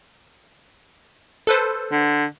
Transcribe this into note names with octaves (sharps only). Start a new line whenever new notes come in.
A4 B4 C5
D3